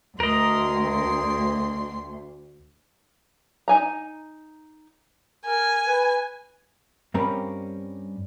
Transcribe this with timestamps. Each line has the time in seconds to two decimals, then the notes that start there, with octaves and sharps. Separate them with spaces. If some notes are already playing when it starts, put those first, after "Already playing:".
0.20 D2 A#4 D#5 C6
3.68 D#4 G#5 A#5
5.45 A#4 G#5
5.87 B4
7.14 G2 G3 C4 C#4 A#4 B5